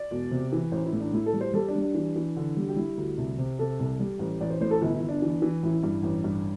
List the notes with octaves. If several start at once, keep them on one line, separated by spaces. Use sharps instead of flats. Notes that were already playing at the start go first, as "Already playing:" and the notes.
Already playing: D5
E1
C3
E3
A1 C5
E4
A2
D4
A2 E4
A4
G3
C5
G3 A4
D4
G3
D4
E3
E3
D3
G3
G4
G3 E4
D2
C2
C3
C3 A4
C2
G3
A1
A1 D5
C5
A2 C5
A4
G1 E4
E4
G1
D4
E3
E3
A1 E4
G2
A1
G2